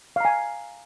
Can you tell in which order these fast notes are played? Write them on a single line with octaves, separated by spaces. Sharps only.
F5 A#5 G#5